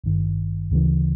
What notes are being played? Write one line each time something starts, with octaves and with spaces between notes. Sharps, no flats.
G#1 G2 D#3
D2 C#3 E3